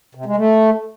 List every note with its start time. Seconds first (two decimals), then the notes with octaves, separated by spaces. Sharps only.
0.15 C3
0.26 G#3
0.36 A3